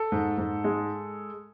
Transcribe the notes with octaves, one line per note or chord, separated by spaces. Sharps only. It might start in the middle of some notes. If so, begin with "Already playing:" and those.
Already playing: A4
G#2
G#2
G#3